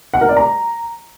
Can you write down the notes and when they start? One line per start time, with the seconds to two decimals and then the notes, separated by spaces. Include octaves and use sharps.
0.14 F#5
0.21 A#4
0.29 D5
0.37 A#5